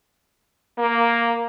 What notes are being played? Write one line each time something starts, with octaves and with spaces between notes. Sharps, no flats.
A#3